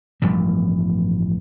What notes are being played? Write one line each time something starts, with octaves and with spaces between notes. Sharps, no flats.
A1 G2 F3 G3